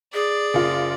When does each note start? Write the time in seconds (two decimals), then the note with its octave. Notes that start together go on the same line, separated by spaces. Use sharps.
0.14 G#4 D5
0.54 F#1 F4